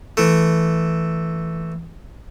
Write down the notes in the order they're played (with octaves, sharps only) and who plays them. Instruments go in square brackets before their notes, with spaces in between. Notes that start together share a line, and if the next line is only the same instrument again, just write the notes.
[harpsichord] E3 A3